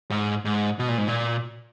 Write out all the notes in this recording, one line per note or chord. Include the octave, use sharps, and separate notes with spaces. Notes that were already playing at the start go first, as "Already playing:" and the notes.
G#2
G#2
B2
A#2
G#2
A#2